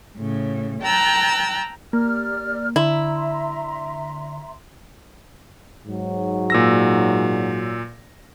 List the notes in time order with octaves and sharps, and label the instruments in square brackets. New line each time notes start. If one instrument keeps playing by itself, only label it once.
[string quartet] A2 C#3
G5 A5 A#5 E6 F#6
[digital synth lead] A#3 [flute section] G4 D5 F6
[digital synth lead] D3 [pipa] E4 [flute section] E5 A#5 C6
[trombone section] G#2 F#3
[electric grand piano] A#2 E6 A#6